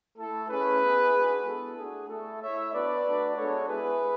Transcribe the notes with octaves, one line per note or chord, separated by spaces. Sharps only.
A3 E4 A4
A3 C#4 E4 G#4 B4
B3 E4
G#3 D4 F#4
B3 E4 A4
A3 D4 F#4 G#4
A3 E4 A4
A3 E4 C#5 E5
B3 D4 F#4 B4 D5
A3 D4 F#4
G#3 B3 D4 F#4 A4 C#5
G#3 B3 E4 G#4 B4